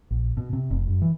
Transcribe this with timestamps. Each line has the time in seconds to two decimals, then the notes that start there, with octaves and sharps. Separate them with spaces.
0.11 A#1
0.37 B2
0.53 C3
0.71 F1
0.87 F#2
1.02 E3